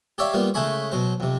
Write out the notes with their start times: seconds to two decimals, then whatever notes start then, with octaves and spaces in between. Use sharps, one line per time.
0.18 G4 C#5 D5 E5 F5
0.33 G3 A#3 B3 F4
0.54 C#3 G#3 A3 G#4 B5 C#6
0.92 B2 F#3 C5
1.20 F2 C3